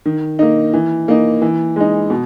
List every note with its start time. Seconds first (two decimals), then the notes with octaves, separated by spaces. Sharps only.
0.05 D#3
0.39 A#3 D#4
0.73 E3
1.08 A#3 D#4
1.42 E3
1.76 G#3 D#4
2.10 B2